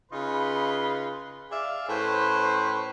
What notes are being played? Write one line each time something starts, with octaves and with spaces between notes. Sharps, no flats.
C#3 D#4 F4 B4 B5 C6
G#4 D5 E5 F5
A2 C#4 E4 B4 C5